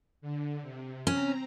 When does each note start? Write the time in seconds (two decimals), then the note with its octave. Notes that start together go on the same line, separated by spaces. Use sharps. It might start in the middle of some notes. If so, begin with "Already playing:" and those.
0.22 D3
0.61 C3
1.07 C4 C#4 A#5